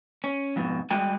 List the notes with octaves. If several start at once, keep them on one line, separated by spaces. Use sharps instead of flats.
C#4
F2 G#2 B2
G3 G#3 F#4 G5 G#5